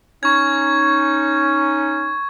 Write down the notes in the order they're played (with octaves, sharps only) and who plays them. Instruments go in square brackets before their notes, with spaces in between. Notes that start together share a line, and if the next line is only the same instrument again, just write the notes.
[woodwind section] C#4 D#4 [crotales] C#6 G#6